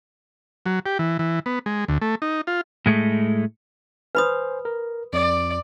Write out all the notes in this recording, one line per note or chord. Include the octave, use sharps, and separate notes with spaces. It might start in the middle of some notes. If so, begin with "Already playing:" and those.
F#3
G4
E3
E3
B3
G#3
D2
A3
D#4
F4
A2 G#3 A3
B4 C5 G#5 B5 D#6
A#4
F2 D5